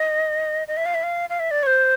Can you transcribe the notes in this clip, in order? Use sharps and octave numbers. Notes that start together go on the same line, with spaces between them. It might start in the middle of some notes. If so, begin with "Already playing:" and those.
Already playing: D#5
D#5
E5
F5
E5
F5
F5
E5
D5
C#5
C5